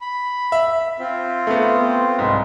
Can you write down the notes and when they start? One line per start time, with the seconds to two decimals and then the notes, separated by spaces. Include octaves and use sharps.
0.01 B5
0.52 E5
0.99 C4 F4
1.47 A3 B3
2.19 C2 G#2